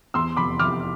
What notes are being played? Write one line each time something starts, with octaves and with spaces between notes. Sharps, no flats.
E2 C6 E6
F1 B5 D6
F1 D6 F6